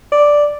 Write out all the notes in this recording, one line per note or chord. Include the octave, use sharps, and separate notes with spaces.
D5